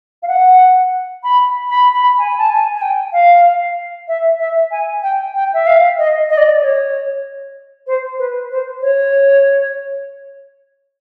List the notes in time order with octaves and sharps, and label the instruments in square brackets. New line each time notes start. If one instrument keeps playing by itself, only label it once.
[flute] F5
F#5
B5
B5
B5
G#5
A5
G#5
G#5
G5
F5
E5
E5
G#5
G5
G5
E5
F5
D#5
D#5
D5
D#5
C#5
C5
B4
C5
C#5